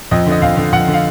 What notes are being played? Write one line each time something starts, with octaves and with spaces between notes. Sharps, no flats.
F2 D#5
D3 D#5
F2 F5
D3
F2 F#5
D3
F5